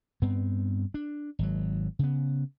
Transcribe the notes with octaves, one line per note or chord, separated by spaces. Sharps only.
G2 B3 C4
D4
G#1 F#3
C#3 B3